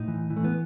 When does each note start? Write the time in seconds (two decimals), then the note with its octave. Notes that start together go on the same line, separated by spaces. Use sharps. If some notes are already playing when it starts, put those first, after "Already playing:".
Already playing: A2 D#4
0.08 E3
0.30 E3
0.36 A3
0.44 B3